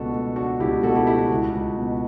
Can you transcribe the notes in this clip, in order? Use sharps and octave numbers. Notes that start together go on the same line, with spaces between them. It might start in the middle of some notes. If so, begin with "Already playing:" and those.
Already playing: C#2 B2 D4 F#4 A4
A3
D4 F#4
C#2 E4 G4
B2 F#4 A4
E4 G4
A3 E4
F#4
C#2
C#2
B2